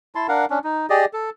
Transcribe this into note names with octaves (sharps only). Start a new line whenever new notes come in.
E4 A5 C6
D4 A#4 F5 F#5
C#4 D4
D#4
G4 G#4 D5 D#5
A4